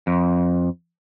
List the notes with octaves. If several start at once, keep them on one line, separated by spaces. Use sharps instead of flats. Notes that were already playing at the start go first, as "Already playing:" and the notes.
F2